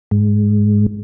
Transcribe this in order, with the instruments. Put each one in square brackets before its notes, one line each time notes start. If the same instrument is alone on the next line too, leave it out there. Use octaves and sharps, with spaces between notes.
[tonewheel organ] G#2